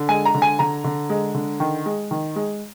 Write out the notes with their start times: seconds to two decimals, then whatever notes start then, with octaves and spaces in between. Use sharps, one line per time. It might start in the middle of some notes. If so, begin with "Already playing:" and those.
Already playing: D3
0.09 G#3 G#5
0.25 A#5
0.34 D3
0.42 G#5
0.59 D3 A#5
0.84 D3
1.10 G#3
1.35 D3
1.60 D#3
1.86 G#3
2.11 D#3
2.36 G#3